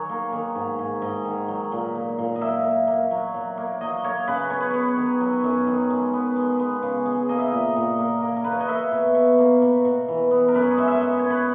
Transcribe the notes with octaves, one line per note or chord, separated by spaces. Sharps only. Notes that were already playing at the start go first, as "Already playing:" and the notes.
Already playing: D#3 F#3 G#4 C#5
A#3
D#3
G#2
G#2
G#2 D#5
D#3
F#3
A#2
A#3
A#2
D#5
A#3 E5
A#3
A#3
F#3
F#3
A#3
F#3 D#5
A#3 C#5
C#3 B4
B3 C#5
B4
B3 C#5
D#3
F#3
F#2
D#3
G#3
B3
G#3
B3
C#3
G#3
A#3 D#5
E5
A#2 D#5
A#2
A#3
A#3
A#4
A#3 B4
C#5
D#5
A#3 E5
B2
B2
A#3
B2
B2
E3
B3
A#4
F#2 B4
C#5
D#5
G#3 E5
E5
D#5
B3
C#5
B3
B4